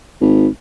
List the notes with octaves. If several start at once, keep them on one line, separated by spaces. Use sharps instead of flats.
G#1